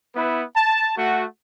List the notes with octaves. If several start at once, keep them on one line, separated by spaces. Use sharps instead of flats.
B3 E4 B4
A5
A3 F#4